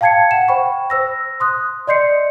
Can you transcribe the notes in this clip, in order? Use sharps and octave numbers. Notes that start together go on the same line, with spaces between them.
F5 G5 A5 G#6 C7 C#7
F#5 E7
C5 G5 B5 C#6
C5 E6 A#6
C6 D#6 F#6
D5 D#5 C6 G6 C7 C#7